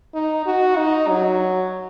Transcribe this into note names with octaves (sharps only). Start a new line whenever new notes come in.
D#4
F#4
D#4
F#3